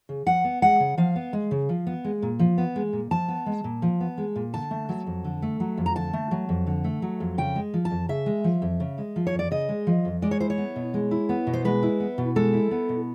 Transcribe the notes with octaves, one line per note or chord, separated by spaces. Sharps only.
C#3
F3 F#5
B3
G#3 F#5
C#3
F3 F5
B3
G#3
C#3
F3
B3
G#3
A#2
F3
B3
G#3
A#2
F3 A5
B3
G#3
A#2
F3
B3
G#3
A#2
D3 A5
A3
F#3
F2
D3
A3
F#3
F2
A#5
D3 A5
A3
F#3
F2
D3
A3
F#3
F2
C#3 G5
G#3
F3
A5
F2
C#3 E5
G#3
F3
F2
C#3
G#3
F3
C#5
F2
D5
C#3 D#5
G#3
F3
F2
G#3 D5
C#5
E4 C5
C#5
B3
B2
G#3
E4
B3
B2
C5
G#3 B4
E4
B3
B2
G#3 A4
E4
B3
B2